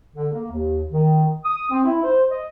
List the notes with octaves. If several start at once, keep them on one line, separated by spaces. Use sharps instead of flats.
D3
A#3
D#2
D#3
D#6
C4
E4
C5
D#5